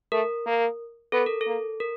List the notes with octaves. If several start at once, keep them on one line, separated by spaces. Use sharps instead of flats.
A3 A#4
A#3
B3 A4
A#4
A4
A#3
A#4